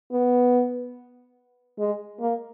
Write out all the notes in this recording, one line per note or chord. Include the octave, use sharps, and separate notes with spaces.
B3
G#3
A#3